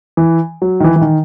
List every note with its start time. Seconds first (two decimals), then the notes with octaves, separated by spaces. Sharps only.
0.17 E3
0.62 F#3
0.80 D#3
0.84 E3
0.96 E3
1.01 D#3